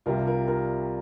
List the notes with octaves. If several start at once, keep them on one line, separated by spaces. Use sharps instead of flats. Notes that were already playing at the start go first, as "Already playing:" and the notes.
C2 C3 G3 F4 A#4
F4 A#4
F4 A#4